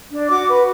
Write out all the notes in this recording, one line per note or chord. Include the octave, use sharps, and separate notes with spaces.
D4
F#4 D6
B4